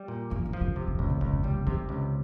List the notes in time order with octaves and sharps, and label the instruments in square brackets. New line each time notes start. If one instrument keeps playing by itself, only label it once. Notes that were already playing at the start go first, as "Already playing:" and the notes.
Already playing: [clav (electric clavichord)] G3
A#2
[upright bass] F3 [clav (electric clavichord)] A#3
[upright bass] D#3
[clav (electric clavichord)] F3
[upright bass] C#3
[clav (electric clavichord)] C3 [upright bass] D#3
[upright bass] C#3
[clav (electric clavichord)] C#2 [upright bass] A#2
[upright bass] A#2
[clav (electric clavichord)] C#2 [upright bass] C3
[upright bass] C#3
[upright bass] D#3 [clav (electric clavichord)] G3
[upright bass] F3
[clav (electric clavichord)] C3 [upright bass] D#3
[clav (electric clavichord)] C#2